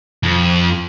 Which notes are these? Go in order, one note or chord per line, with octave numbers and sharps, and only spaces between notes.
F2